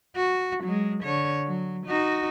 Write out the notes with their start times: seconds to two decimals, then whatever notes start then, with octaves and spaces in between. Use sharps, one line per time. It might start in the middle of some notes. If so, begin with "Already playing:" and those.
0.16 F#4
0.64 F#3 G#3
1.03 D3 C#5
1.47 F#3
1.87 D#4 F#4